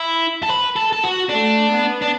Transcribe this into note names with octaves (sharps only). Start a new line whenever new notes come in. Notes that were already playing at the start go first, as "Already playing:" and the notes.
Already playing: E4
A4
B4
A4
A4
F#4
A3 D4
B3
D4